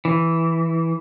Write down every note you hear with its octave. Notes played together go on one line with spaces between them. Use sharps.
E3